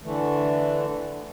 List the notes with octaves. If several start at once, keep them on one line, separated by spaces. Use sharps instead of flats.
D3 E3 A3